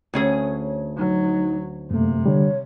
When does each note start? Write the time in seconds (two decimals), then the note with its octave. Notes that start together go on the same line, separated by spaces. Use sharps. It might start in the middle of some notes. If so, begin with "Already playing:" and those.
0.14 D2 C#4 G#4
0.97 F#3 D#4
1.91 F#2 C3 A3 A#3
2.26 D3 G3 C#5